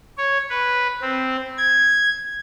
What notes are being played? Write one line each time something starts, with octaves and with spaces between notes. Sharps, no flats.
C#5
B4
C4
G#6